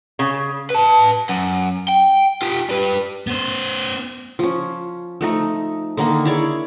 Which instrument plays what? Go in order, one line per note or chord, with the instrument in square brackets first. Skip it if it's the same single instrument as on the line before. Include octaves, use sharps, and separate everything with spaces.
[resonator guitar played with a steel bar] C#3
[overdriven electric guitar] B4 A5
F#2
G5
F4 G4
G3 B4
[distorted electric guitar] B3 C5
[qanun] F3 C#4
F3 A3 D#4
D3 D#3 A#3 D#5
E4 G#4 C#5 D5